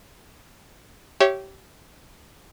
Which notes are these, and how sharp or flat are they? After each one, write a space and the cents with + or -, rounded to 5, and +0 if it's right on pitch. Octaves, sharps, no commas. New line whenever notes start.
G4 -20 C#5 +0 E5 +0